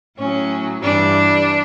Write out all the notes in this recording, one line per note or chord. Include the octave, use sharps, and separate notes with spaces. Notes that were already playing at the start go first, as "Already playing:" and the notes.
A2 F#3 C#4
G2 E3 G3 D4